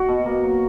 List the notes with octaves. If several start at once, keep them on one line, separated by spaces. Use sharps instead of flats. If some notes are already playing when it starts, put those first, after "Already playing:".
Already playing: F#4
B2
A#3
F#3